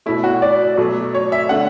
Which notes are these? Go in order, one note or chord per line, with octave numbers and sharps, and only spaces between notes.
B2 A3 E4
F#4
D5
B2 F#3 A3
C#5
E5
D3 A3 F#5